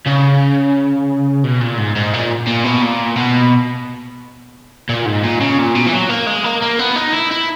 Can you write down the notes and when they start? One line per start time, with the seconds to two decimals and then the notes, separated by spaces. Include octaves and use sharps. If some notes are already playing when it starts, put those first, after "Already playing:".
0.06 C#3
1.44 B2
1.61 A#2
1.78 G#2
1.96 G#2
2.14 A#2
2.47 A#2
2.64 B2
2.82 A#2
3.17 B2
4.89 A#2
5.06 G#2
5.23 A#2
5.40 C#3
5.58 A#2
5.75 B2
5.86 E3
5.93 F#3
6.09 A#3
6.26 G#3
6.44 A#3
6.62 A#3
6.79 B3
6.96 D#4
7.14 E4
7.31 E4